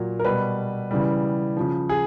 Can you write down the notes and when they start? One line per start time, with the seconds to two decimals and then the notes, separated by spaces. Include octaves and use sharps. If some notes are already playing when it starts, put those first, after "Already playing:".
Already playing: A#2 F#3
0.20 A#4
0.24 B2 G3 B4
0.91 C#3 E3 G3
1.57 C#3 F3
1.89 G#4